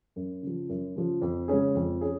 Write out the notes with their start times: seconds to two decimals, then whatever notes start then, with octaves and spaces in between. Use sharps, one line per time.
0.16 F#2
0.43 C#3 F3
0.69 F#2
0.96 C#3 F3
1.22 F2
1.48 C#3 G#3 C#4 G#4
1.75 F2
2.01 C#4 G#4